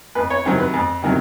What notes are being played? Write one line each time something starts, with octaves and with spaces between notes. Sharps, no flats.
F2 B4
C#5
C3 D#3 F#3 C5
B4
F2
C3 D#3 F#3